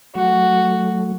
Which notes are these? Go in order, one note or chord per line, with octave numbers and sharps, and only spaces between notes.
F#3 A3 F#4